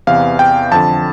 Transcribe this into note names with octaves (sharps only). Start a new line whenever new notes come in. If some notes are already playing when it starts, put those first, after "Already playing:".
E2 C3 E3 F5
G5
F2 D3 A5